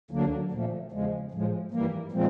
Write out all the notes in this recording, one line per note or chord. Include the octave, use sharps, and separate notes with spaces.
D2 D3 F#3 A#3 D4
A#2 F3 A3
E2 C#3 F3 G#3
A2 F3 G#3
G2 E3 G3 A#3
A#2 F3 G#3 C4